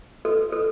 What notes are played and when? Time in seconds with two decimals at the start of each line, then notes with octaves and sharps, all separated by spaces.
0.25 A4
0.53 A4